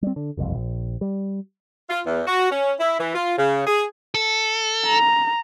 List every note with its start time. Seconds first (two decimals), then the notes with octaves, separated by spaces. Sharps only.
0.02 G3 C4
0.16 D3
0.37 F#1 C2 F2
0.54 A#1
1.01 G3
1.90 F4
2.06 E2
2.27 F#4
2.51 C#4
2.80 E4
2.99 E3
3.15 F4
3.38 C#3
3.67 G#4
4.14 A4
4.86 A#5